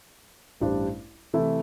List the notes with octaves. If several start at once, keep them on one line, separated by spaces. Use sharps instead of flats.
A1 G2 G3 D4 C5
C3 E3 A3 E4